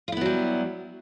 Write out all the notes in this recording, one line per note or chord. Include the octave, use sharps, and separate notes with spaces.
F#3 G3 B3 E4 F4